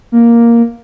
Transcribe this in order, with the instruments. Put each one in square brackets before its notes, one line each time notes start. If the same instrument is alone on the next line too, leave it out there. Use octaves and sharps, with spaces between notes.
[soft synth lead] A#3